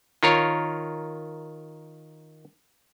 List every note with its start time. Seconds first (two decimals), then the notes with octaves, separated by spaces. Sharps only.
0.23 D#3 F4 A#4 C#5